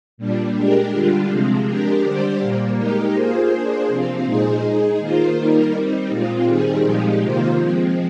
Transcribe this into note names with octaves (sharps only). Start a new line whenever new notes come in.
A#2 G3 D4
G#3 D4 G4 A#4
D3 G3 D4 F4
C3 F3 G#3 C4
G#3 D4 G4 A#4
D3 G3 D4 G4 C5
A#2 G3 A#3
G#3 D#4 G4 A#4
A#3 F4 G#4 C5
A#3 D4 G#4 C5
C3 F3 C4 F4
A#2 G#3 D#4 G#4 C5
G#3 D#4 G#4
D#3 A#3 F4 C5
D#3 G3 A#3 D#4 A#4
G3 C4 D#4
A#2 G#3 C4 F4
D#3 G3 C4 D#4 G#4
A#2 F3 G#3 D#4 G4
C3 D#3 A#3 F4 C5
F3 G#3 C4